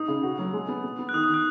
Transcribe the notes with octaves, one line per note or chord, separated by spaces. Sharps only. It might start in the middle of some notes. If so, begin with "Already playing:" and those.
Already playing: D#4 D#6
C#3
F#4
F#3
G#3
B3
B3
B3
F#6
D#3 D#6
D#3 D#6
F#6